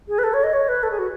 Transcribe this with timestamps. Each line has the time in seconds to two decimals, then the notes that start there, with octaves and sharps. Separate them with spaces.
0.08 G#4
0.19 B4
0.24 A4
0.34 C#5
0.44 D#5
0.53 C#5
0.69 B4
0.83 A4
0.91 G#4
0.99 F#4